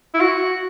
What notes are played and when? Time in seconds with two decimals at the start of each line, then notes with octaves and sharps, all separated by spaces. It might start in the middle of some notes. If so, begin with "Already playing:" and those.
0.14 E4
0.21 F#4